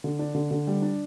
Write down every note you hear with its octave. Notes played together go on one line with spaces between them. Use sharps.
D3
D4
D3
D3
G3
D4